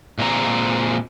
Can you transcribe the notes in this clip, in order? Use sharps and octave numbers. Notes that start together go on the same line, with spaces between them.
A#2 G#3 C4 A#5